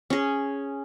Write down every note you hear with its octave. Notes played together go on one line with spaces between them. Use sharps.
C#4 G#4